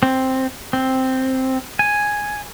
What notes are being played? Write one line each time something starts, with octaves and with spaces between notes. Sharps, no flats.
C4
C4
G#5